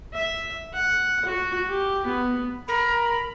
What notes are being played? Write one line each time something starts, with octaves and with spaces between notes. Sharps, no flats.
E5
F#5
F#4
G4
B3
A#4 B5